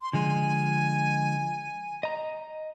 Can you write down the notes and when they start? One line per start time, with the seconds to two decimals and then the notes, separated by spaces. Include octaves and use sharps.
0.02 C6
0.13 D3 F3 G#3 G#5
2.03 D#5 A#5